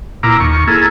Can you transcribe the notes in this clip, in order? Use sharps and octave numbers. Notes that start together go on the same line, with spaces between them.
A#2 E4 F4 A#5 D6
D#2 C#6
A#3 E4 G#4 A4